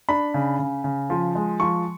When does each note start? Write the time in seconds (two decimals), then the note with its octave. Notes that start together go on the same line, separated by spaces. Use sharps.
0.09 D4 B5
0.34 C#3
0.59 C#3
0.84 C#3
1.10 F3
1.35 G#3
1.60 F3 C#6